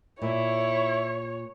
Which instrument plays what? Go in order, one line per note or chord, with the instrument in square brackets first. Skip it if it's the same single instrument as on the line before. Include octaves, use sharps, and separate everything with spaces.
[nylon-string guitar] A#2 [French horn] E4 [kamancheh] C#5